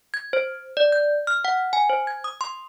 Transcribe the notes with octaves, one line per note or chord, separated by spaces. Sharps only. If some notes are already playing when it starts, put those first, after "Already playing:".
G#6
C5
D5
G6
F6
F#5
G#5
C5
G#6
D#6
C6